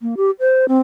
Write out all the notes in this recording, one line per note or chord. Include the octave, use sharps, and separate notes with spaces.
A#3
G4
C5
C4